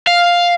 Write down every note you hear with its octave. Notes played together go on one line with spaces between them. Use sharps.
F5